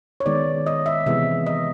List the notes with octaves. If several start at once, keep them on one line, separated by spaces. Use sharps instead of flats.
C#5
D#3 G#3 B3 D5
D#5
E5
C3 E3 G#3 B3 E5
D#5